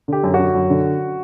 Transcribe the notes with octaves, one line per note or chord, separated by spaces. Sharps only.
D3 G4
F#2
D3 F#4
F#2
D3